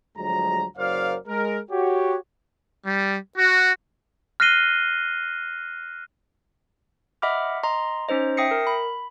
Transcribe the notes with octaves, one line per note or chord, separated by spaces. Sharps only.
D2 F3 F#3 G#3 A#5
F#1 F#3 A#4 C5 D5 F5
G#3 A#4
F#4 G4 C#5
G3
F#4
F6 F#6 A#6 C7 D#7 G7
D#5 E5 F#5 B5 D6 F6
D#5 A#5 C6
C#4 D#4 C5 D#5
E5 G5 D#6 A#6 C7 C#7
A#4
B5